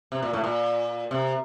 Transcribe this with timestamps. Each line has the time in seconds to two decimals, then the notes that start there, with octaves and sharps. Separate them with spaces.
0.12 C3
0.22 A#2
0.33 A2
0.44 A#2
1.11 C3